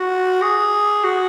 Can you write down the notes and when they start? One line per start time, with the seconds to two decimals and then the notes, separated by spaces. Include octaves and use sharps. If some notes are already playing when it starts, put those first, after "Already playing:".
Already playing: F#4
0.42 G#4
1.04 F#4